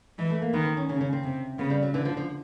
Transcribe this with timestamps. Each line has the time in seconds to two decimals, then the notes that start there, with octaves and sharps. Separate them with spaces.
0.18 E3 G#3
0.30 A3
0.42 A#3
0.53 D#3 B3
0.65 C4
0.77 C#4
0.89 C#3 C#4
1.01 C#4
1.13 C4
1.24 C3
1.58 C#3 B3
1.70 G3
1.83 F#3
1.93 D3 E3
2.05 F3
2.17 F3